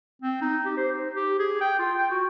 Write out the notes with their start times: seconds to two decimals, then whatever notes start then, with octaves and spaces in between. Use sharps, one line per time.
0.22 C4
0.42 D#4
0.66 G4
0.77 C5
0.92 D#4
1.16 G4
1.39 G#4
1.61 G5
1.79 F4
1.98 G5
2.11 F#4